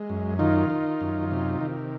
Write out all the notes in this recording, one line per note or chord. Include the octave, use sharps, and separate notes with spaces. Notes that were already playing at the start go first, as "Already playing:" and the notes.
Already playing: G#3
F#2
D#3 D#4 F4
D#3
F#2
C3
D#3